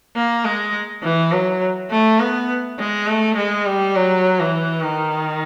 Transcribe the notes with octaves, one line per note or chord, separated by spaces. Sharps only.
A#3
G#3
E3
F#3
A3
B3
G#3
A3
G#3
G3
F#3
E3
D#3